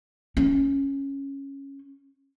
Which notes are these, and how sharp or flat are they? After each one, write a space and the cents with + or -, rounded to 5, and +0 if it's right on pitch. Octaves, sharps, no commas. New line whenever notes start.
C#4 -10